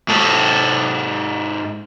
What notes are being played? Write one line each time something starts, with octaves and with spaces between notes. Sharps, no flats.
G#2 A4